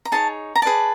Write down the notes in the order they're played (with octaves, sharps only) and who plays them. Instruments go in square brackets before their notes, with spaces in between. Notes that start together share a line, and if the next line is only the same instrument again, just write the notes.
[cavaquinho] A#5
D#4 G#4 C#5 A5
A#5
G#4 B4 D5 A5